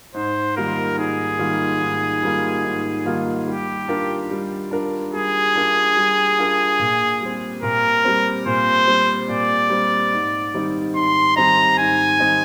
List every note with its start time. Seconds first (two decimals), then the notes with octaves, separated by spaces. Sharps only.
0.14 G#2 C5
0.57 D#3 G3 A#3 F4 A#4
0.97 G#2 G#4
1.39 D#3 G3 A#3 F4
1.81 G#2
2.22 D#3 G3 A#3 F4
2.64 G#2
3.05 D#3 G3 A#3 F4
3.47 G3 G4
3.88 D4 F4 A#4
4.31 G3
4.71 D4 F4 A#4
5.13 G3 G#4
5.55 D4 F4 A#4
5.97 G3
6.38 D4 F4 A#4
6.79 A#2
7.21 G3 C4
7.62 A#2 A#4
8.05 G3 C4
8.46 A#2 C5
8.87 G3 C4
9.28 A#2 D5
9.70 G3 C4
10.13 G#2
10.54 D#3 G3 C4 D#4
10.95 G#2 C6
11.36 D#3 G3 C4 D#4 A#5
11.78 G#2 G#5
12.19 D#3 G3 C4 D#4